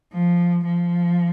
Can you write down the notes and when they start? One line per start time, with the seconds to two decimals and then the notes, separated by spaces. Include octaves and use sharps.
0.13 F3
0.64 F3